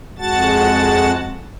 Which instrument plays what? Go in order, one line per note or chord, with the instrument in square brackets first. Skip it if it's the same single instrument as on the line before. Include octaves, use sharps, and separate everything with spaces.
[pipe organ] F2 G#3 F#4 F#5 A5 A6